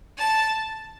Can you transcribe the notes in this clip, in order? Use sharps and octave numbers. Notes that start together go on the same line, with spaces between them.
A5